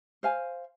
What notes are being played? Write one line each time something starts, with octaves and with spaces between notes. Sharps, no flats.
C5 F5 G#5